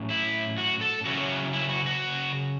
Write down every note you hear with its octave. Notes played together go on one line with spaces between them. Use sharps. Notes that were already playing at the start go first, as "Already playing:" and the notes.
Already playing: A2 F#3 C#4
E4
F#4
A4
C#3 F#3 C#4 E4 F#4
E4
F#4
F#4